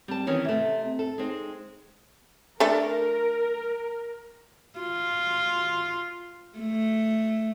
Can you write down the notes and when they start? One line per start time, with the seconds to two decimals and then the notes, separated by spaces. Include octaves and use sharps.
0.08 G3 C4 A5
0.27 D#3 E3 C#4
0.45 C3 A3 E5
0.84 C4
0.99 A4
1.18 G#3 C4 D#4
2.60 A3 D4 A4 A#4
4.79 F4
6.58 A3